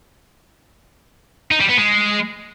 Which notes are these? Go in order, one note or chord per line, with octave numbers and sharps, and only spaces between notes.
D#4
G3
B3
G#3